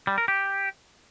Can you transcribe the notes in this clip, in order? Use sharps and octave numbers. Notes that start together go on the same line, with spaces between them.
G3
A#4
G4